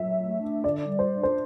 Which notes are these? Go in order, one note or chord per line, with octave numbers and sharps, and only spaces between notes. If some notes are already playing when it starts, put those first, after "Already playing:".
Already playing: F#3 E5
A3
D4
D3 D5
G3
C5
D4
C5